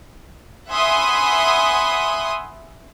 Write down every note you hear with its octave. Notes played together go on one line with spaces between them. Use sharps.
E5 F#5 G#5 B5 C6 D#6